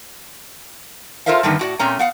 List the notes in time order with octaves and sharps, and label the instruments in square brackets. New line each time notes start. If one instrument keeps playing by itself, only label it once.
[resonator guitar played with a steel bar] F4 A4 A#4 C5 E5 F5
G2 D3 D#3 G3 A3 B3
A2 F#4 D5
A#2 A3 C4 C#4 A#5
B3 F5 F#5